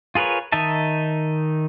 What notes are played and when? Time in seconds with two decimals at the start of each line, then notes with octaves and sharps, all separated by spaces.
0.15 F4 G#4 A#4 B4 C#5
0.52 D#3 D#4 D#5 E5 A5